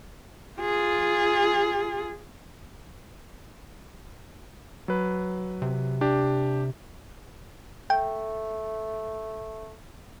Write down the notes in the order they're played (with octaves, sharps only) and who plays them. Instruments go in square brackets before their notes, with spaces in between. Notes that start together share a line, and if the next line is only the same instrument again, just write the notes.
[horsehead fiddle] F4 G#4
[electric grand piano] F#3 B4
[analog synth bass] C3
[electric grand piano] D4 G4
[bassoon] A3 [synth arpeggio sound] G5